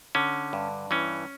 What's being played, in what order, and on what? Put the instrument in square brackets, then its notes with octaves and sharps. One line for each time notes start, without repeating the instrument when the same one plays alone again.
[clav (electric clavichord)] D3 C#4
G2
E3 C#4